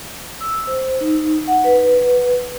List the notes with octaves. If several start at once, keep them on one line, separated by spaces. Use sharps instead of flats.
E6
C5
D#4
F#5
B4